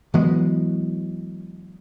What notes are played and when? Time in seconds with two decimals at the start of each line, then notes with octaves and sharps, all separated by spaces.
0.14 E3 F#3 G#3 B3